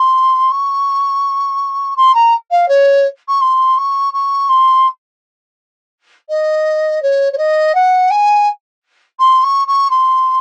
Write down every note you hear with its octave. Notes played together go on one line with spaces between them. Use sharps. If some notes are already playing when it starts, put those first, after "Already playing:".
Already playing: C6
C#6
C6
A#5
F5
C#5
C#6
C6
C#6
C#6
C6
D#5
C#5
C#5
D#5
F#5
G#5
C6
C#6
C#6
C6